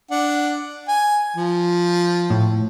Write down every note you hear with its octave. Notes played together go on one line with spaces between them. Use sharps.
D4 F#5
G#5
F3
A2